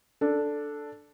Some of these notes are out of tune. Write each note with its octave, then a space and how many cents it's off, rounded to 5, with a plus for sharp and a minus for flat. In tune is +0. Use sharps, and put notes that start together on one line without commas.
D4 +0 A4 +0